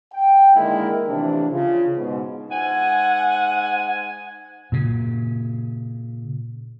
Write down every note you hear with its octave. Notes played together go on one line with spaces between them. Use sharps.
G5
D3 D#3 G#3 A#3 E4 A#4
A2 C3 E3 F3 D4
C#3 F4
G#2 B2
G#2 F#5 G#5
A#2 C#3